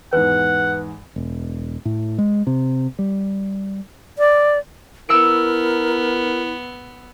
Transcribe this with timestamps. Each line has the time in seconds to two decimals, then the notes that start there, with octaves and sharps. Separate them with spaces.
0.13 E2 G#2 B4 F#5
1.16 E1
1.85 A2
2.18 G#3
2.47 C3
2.99 G3
4.19 D5
5.09 B3 E4 A#4 E6 C#7 D7